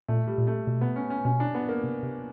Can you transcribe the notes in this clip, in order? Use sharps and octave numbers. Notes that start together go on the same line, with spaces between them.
A#2 A3
G3
A#2
A3
B2
B3
C#4
C#4
B2 C#4
D4
B3
A#3
C3
C3